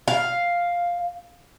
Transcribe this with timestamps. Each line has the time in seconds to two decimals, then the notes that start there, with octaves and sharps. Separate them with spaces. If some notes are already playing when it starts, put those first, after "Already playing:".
0.08 F5